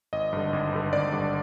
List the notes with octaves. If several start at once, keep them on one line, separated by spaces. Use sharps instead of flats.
G#1 D#5
G2 D3
G#1
G2 D3
G#1 D5
G2 D3